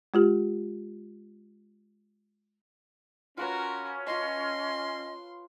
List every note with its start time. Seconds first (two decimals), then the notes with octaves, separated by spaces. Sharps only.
0.14 G#3 F4 G4
3.37 C#4 F4 F#4 A#4 B4 C#5
4.07 F4 D#5 A5 C6